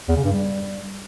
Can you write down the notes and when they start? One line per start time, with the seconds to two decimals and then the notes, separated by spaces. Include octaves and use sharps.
0.08 E2
0.16 C#3
0.24 G2
0.33 G3